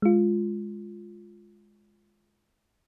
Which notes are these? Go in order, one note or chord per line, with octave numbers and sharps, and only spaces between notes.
G#3 F4